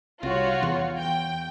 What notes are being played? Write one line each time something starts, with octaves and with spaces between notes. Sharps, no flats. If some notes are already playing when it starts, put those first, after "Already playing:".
C2 F4 F#4 C#5
E2
G5